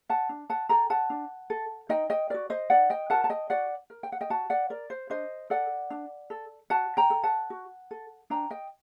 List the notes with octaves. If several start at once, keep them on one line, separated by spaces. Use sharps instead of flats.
F#5 A5
D4
F#5 A5
A4 G5 A#5
F#5 A5
D4
A4
D#4 D#5 G5
D#5 G5
F#4 A#4 D5
C5 D#5
D#4 D5 F#5
D#5 G5
F#4 A#4 F#5 A5
A5
D#5 G5
F#4 D5 F#5
A#4
G5
F#5
D#5 G5
F#4 F#5 A5
D5 F#5
A#4 D5
C5
D4 C5 D#5
A4 D5 F#5
D4
A4
F#4 F#5 A5
G5 A#5
A4
F#5 A5
F#4
A4
D4 G5 A#5
D#5 G5